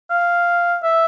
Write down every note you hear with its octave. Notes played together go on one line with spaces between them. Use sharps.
F5
E5